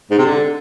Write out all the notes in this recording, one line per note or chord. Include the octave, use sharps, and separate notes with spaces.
G#2
C3
D3